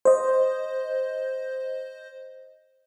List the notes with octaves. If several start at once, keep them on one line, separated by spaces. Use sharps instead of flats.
C5 D#5